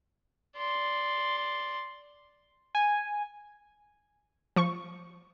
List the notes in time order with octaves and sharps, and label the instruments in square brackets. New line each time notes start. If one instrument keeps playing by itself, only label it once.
[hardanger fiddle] D5 C6
[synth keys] G#5
[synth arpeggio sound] F3 C#6